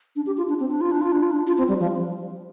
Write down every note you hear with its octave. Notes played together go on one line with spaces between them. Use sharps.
D4
G4
F4
D4
C4
D4
F4
D4
F4
D4
F4
D4
F4
C4
G3
F3